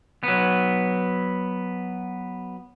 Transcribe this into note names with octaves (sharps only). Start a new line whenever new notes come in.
F#3 B3